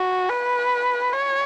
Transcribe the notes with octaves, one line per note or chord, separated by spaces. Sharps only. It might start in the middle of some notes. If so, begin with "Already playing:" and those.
Already playing: F#4
B4
C#5